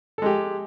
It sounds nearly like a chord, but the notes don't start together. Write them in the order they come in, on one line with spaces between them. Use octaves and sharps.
A4 G#3 G4